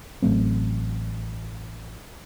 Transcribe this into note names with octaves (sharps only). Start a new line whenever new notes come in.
A1 F#3 A3 C4